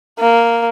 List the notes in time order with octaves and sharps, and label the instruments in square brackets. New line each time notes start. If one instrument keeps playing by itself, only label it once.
[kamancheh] A#3